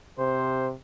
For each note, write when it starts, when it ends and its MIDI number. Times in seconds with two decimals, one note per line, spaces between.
0.19 0.74 48
0.19 0.69 72